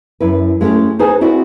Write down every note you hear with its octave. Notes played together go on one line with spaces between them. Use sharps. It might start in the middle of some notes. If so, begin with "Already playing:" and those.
F#2 E4 B4
G#3 A3 B3 C#4 G4
D#4 G#4 B4 C5 G#5
C4 E4 F#4 D5